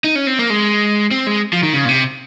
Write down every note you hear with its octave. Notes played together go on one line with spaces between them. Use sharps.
D#4
C#4
C4
A#3
G#3
C4
G#3
F3
D#3
C#3
A#2
C3